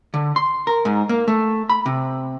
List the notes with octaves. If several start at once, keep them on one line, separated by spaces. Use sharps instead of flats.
D3
C6
A#4
G#2
A#3
A3
B5
C3